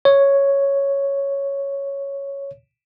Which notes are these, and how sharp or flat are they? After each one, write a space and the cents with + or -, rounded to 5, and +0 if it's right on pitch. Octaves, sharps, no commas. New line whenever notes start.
C#5 +0